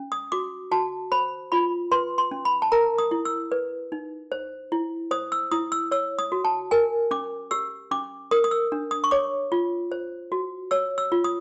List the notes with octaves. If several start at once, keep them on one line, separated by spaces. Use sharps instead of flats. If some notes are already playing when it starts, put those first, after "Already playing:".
Already playing: C#4
D#6
F#4 D6
F#4 A5
C5 B5
F4 B5
B4 C6
C6
C#4
B5
A5
A#4 A#5
D#6
E4
E6
B4
D#4
C5
E4
C5 D#6
E6
E4 D#6
E6
C#5 E6
D#6
F#4
A5
A#4 G#5
C#4 D6
G4 E6
C#4 D6
A#4 D#6
D#6
E6
D4
D#6
C#6
C#5 D6
F4
C5
F#4
C#5 E6
E6
F4
D#6